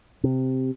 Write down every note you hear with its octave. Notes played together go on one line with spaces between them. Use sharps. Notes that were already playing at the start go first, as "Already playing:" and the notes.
C3